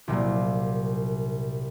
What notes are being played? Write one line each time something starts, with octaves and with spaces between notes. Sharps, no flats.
C2 A#2 F#3 A#3